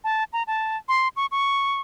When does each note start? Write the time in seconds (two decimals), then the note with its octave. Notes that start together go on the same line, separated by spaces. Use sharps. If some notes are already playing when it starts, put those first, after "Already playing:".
0.04 A5
0.33 A#5
0.47 A5
0.89 C6
1.16 C#6
1.32 C#6